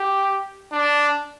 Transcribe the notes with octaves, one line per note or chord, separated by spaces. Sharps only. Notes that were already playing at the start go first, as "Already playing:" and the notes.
Already playing: G4
D4